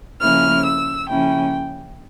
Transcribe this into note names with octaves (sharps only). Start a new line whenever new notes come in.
C#3 F3 A#3 C#4 E4 F6
E6
C#3 F3 A#3 C#4 E4 G5